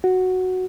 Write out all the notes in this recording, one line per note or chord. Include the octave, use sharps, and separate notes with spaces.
F#4